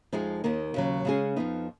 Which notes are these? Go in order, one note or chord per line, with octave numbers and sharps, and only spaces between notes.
F2 F3 G#3 D#4 G#4
D#2 D#3 A#3
D#2 C#3 F#3
C#3 G#3 C#4 G#4
F2 F3 B3 D#4